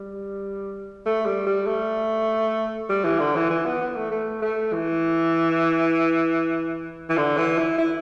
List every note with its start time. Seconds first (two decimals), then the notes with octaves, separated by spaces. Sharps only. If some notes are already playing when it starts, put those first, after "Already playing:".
Already playing: G3
1.06 A3
1.26 G3
1.47 G3
1.67 A3
2.89 G3
3.05 E3
3.20 D3
3.36 E3
3.50 E3
3.66 B3
3.81 B3
3.96 A3
4.11 A3
4.42 A3
4.73 E3
7.10 E3
7.17 D3
7.38 E3
7.59 E4
7.79 E4